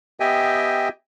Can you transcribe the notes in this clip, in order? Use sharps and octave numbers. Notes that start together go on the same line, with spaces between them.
B3 G4 D#5 E5 G5 G#5